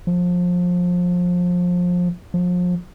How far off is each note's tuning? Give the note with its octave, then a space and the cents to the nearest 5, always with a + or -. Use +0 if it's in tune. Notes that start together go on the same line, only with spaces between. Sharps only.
F3 +25
F3 +35